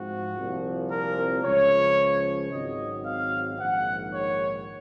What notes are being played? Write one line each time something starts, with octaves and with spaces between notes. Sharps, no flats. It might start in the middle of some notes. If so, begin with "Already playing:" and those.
Already playing: G#2 F3 C4 F#4
C2 A#2 F3 C4
A#4
C#2 C#3 F3 C#5
G#1 G#2 F#3 C4 D#5
F5
A#1 G#2 D#3 F#5
C#5